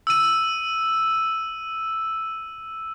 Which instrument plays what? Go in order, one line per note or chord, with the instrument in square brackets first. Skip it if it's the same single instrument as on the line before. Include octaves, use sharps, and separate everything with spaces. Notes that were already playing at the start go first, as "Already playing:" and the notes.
[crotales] E6 D#7